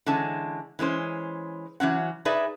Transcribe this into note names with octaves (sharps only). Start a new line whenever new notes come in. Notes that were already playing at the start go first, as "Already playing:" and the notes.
D3 E3 G#3 C#4 A5
E3 G#3 C#4 C5
E3 F#3 C#4 F#5
D#4 G#4 B4 D5 E5